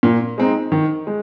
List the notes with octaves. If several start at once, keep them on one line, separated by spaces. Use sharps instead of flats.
A#2
G#3 C4 D#4
D#3
G#3